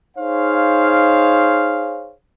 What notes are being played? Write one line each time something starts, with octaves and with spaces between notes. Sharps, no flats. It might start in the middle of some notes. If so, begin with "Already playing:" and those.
D#4 G#4 C5 C#5 F5